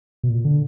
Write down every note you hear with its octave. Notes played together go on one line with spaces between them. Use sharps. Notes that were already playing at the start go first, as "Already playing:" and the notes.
B2
A#2
D3